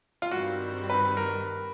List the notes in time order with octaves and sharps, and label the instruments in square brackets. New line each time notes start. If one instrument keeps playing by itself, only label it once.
[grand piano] F4
[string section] G2 D#3 G3 C4 [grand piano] F#4
[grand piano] B4
A#4